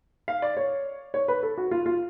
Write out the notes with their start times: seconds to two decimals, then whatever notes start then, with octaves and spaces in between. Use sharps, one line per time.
0.28 F5
0.42 D5
0.57 C#5
1.14 C#5
1.28 B4
1.43 A4
1.58 F#4
1.71 F4
1.86 F4